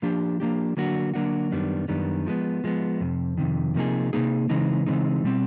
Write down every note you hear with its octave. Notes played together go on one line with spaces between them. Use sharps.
F3 A#3 D4 G4
F3 A#3 D4 G4
D3 F#3 A#3 D4 F#4
D3 F#3 A#3 D4 F#4
F#2 D#3 G3 B3 D4
F#2 D#3 G3 B3 D4
F3 G#3 B3
F3 G#3 B3
F2 C3
F2 C3 D#3
C3 F3 A#3 D#4 G#4
C3 F3 A#3 D#4 G#4
C#3 E3 G#3 C4 D#4
C#3 E3 G#3 C4 D#4
B2 G3 C4